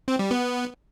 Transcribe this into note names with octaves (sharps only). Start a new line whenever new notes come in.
C4
G3
B3